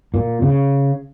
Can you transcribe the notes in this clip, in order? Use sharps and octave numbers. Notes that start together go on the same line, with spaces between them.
A#2
C#3